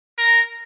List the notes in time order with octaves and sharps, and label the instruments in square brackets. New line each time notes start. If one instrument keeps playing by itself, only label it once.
[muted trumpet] A#4